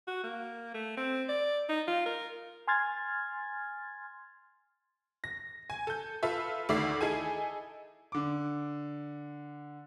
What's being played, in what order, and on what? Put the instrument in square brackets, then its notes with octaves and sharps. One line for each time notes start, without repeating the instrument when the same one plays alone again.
[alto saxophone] F#4
A#3
A3
C4
D5
D#4
F4
A#4
[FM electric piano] G#5 C6 F6 G#6 A6
[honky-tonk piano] A#6
G#5
A4 G6
F4 A4 B4 E5
D2 D#3 A3 D5 E5 C7
D#4 E4 G#4 A4 G#5
[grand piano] D3 D6